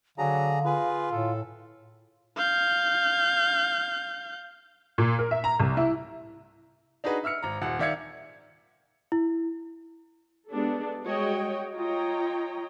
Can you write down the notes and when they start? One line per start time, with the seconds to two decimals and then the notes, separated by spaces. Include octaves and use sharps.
0.18 D3 F#3 D4 G#4 F5 A#5
0.65 F4 G#4 B4
1.12 A2 A4
2.37 F5 G6
4.98 A#2
5.19 A#4
5.31 E5
5.44 A#5
5.60 C2
5.77 E4
7.04 D4 D#4 F#4 G#4 B4
7.24 E5 E6 F6 C#7
7.43 G#1 A#5
7.62 D#1 F#5
7.79 D#3 D5 E5 F5 G#6 C#7
9.12 E4
10.52 G#3 B3 D4 G4 A4 D5
11.04 G3 G#3 F#4 C#5 D#5 G5
11.74 F4 C#5 D#5 G5 A#5